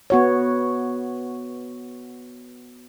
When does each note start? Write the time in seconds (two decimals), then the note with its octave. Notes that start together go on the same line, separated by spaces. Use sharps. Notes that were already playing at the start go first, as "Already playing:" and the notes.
0.10 B3 F#4 C#5